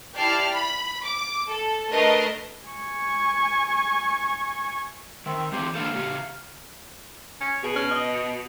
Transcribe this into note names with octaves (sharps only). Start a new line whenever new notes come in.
E4 G4 D5 A5 F6 C7
B5
D6
A4
A3 D4 A#4 B4 D#5 C7
G#5 C#6
D#3 C4 E5
E3 C4 G4 C5
D3 A#3 A4 F5
C#3 G4
C#4
B2 G#4
C#4
D#5